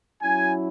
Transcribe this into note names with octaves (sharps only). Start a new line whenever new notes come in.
F#3 C#4 E4 G#5